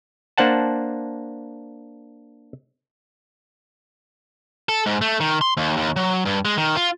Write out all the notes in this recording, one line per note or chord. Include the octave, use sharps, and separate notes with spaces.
A#3 D4 C5 F#5 A5
A4
G#2
A3
D#3
C6
D#2
D#2
F#3
G2
G#3
D#3
F4